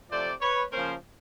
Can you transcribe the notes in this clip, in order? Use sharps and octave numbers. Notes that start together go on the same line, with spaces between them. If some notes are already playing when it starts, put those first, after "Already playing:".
C3 F3 A3 C5 D5
B4 C#5
C#3 F3 A#3 C#4 A#4 C5